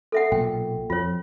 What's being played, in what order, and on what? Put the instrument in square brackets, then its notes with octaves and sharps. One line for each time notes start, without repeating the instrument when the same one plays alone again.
[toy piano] A4 E5 F#5
[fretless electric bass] B1 A#2 [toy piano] G5
[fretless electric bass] F2 [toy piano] F4 C#5